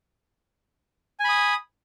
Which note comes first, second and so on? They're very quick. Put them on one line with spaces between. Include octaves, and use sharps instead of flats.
G#5 B5 D#6